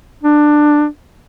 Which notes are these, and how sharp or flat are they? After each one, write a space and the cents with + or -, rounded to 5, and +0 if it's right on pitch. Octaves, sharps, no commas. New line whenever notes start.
D4 +15